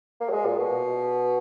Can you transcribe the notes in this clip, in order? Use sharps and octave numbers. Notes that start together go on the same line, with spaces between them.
A#3
F#3
G#3
A#2
B2